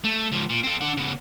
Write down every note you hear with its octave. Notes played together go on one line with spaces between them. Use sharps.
A3
C#2 F3
A#2
C4 A4
D4 F#5
C#3 B3